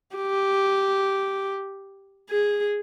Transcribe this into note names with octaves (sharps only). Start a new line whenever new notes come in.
G4
G#4